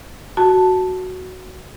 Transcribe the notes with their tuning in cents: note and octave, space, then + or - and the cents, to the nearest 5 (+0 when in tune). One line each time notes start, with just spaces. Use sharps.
F#4 +0 A5 +0